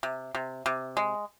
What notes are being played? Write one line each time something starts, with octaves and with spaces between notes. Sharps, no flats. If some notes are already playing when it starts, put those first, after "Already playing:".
C3
C3
C3
G#3